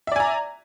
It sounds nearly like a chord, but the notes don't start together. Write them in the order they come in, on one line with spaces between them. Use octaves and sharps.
E5 D5 G#5 A#5